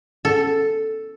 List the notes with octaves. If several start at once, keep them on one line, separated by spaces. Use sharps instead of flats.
A4